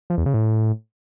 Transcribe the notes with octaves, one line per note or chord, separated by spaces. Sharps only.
F3
E2
C#3
A2